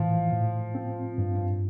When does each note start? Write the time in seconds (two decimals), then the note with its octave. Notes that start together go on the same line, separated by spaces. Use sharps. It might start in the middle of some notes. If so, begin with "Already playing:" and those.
Already playing: A2 E3 F3
0.32 A2
0.75 C4
1.18 G2